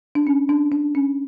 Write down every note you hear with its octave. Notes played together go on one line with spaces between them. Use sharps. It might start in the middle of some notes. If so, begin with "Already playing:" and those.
D4
C#4
D4
D4
C#4